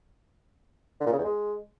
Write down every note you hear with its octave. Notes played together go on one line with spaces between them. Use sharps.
D3
A#2
C#3
E2
G#3